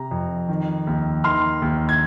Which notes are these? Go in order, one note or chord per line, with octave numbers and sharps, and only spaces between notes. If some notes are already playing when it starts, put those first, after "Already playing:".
Already playing: C3 A#5
F2
D#3
D#2
D#3 C6 F6
D#2
G#6